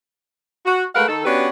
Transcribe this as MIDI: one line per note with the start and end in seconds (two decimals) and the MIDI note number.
0.66 0.84 66
0.95 1.06 56
0.95 1.06 57
0.95 1.06 70
0.95 1.06 71
0.95 1.06 77
0.95 1.06 78
1.08 1.22 51
1.08 1.22 69
1.25 1.49 59
1.25 1.49 61
1.25 1.49 62
1.25 1.49 66
1.25 1.49 67
1.25 1.49 71